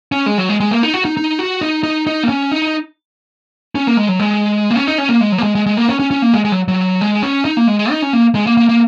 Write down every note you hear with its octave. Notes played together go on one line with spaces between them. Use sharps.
C#4
G#3
F#3
G#3
G#3
A#3
D#4
F#4
D#4
D#4
F#4
D#4
D#4
D#4
A#3
C#4
D#4
C#4
A#3
G#3
F#3
G#3
A#3
C#4
D#4
C#4
A#3
G#3
F#3
A#3
G#3
G#3
G#3
A#3
C#4
C#4
C#4
A#3
G#3
G#3
F#3
F#3
G#3
C#4
D#4
A#3
G#3
G#3
D#4
C#4
A#3
G#3
A#3
A#3
A#3